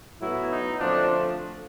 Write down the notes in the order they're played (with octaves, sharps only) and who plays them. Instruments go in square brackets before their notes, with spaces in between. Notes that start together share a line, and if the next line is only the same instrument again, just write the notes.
[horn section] A2 F#3 B3 E4
D#4
D3 F3 A3 C4 D4